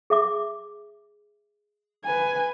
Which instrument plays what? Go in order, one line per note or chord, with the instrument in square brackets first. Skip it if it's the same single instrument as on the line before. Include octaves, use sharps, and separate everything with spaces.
[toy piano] G#4 E5 D6
[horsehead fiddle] B4 G#5